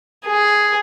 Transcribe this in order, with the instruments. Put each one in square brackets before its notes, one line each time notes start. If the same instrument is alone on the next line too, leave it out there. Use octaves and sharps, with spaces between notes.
[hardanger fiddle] G#4